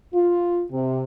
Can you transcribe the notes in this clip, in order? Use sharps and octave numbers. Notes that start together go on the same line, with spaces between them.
F4
C3